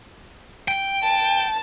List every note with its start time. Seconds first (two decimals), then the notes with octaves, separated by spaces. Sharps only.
0.68 G5
1.03 A5